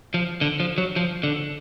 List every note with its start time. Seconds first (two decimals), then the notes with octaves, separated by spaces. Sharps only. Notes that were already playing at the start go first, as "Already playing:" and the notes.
0.14 F3
0.41 D3
0.60 F3
0.78 F#3
0.96 F3
1.23 D3